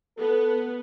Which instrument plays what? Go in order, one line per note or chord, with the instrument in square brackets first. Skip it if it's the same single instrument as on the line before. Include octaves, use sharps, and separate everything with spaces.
[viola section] B3 [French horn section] A4